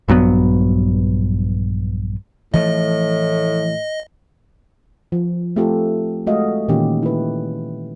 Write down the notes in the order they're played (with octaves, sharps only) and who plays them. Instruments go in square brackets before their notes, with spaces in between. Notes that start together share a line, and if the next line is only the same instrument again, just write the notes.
[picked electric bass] A#1 G2 F#3 B3
[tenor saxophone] A2 [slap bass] E3 F3 A3 [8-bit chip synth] D#5
[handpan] F3
A3 C4 F4 G4 A4
G#3 A3 F#4 D#5 F5
A#2 D#3 E3 C#4 G4
E4 B4